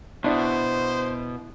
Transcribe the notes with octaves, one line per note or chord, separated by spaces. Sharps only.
B2 D4 E4 C5